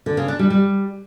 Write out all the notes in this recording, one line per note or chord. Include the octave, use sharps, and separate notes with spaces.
D3
C#3
D4
G3
G3